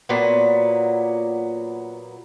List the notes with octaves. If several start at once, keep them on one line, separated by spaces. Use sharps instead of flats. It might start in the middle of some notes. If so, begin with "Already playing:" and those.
A#2 F#3 B3